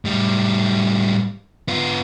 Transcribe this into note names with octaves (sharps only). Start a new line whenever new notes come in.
A2 G3
B3 F4